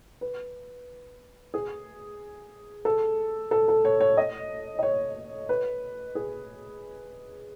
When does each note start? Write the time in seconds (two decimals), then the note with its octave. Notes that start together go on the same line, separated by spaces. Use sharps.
0.21 B4
1.54 G#4
2.85 A4
3.51 A4
3.68 A4
3.85 C#5
4.00 C#5
4.17 D#5
4.79 D#5
4.83 C#5
5.49 B4
6.15 G#4